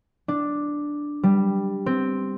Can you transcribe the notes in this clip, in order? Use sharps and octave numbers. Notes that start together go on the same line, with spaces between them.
D4
G3
C4